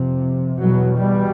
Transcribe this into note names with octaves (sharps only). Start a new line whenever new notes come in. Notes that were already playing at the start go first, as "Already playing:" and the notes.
Already playing: F2 C3
E2 B2 F#3
G3